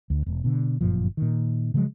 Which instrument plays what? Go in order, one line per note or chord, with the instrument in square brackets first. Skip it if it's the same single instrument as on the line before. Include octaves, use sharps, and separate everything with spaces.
[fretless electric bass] D2
E1
B2 D3
G1 F#2 A#2 F3
A#2 D#3
C#3 F3 F#3 G#3